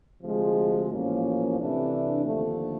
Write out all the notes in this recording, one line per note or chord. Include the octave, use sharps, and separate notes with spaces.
D2 C3 F3 G#3
A1 G#2 F3 A#3 C#4
C3 E3 A3 D4
D#2 D3 F3 A3